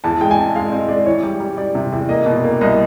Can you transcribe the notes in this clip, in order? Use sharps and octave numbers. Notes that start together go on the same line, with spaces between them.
E2 A5
G#3 G5
G#5
C4 A5
G#3 F5
C4 D#5
G#3 D5
E3 C#5
G3
G3
G3 D5
C3
E2
A#3 D#5
B2
A#3
C2 D#5